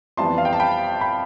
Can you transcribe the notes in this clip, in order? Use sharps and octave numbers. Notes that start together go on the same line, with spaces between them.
F2 E3 G3 B3 A5 C6
F5
G5
A5
G5 B5
G5 B5